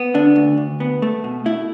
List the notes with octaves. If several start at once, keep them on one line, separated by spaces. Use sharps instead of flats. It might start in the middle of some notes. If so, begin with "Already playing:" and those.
Already playing: B3
D3 D4
D2
D2
B3
A3
B2
A3 E4